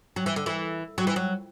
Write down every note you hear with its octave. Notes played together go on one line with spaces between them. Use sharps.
F#3
E3
D3
E3
F#3
E3
F#3